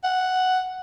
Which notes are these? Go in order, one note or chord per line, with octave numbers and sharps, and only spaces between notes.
F#5